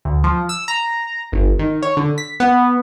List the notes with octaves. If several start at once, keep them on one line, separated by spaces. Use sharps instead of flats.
D2
F3
E6
A#5
G1
D#3
C#5
D3
B6
B3